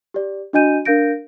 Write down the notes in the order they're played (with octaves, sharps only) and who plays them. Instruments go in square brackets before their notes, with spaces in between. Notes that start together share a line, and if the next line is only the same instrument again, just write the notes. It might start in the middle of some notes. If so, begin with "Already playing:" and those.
[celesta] G4 D5
D4 F#4 D#5 G#5 G6 D#7
D4 A#4 F5 G6 A#6 D7